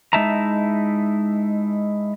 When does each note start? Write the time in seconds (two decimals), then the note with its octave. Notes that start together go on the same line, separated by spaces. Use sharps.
0.13 G#3 D#4 E4 E5 A5 A#5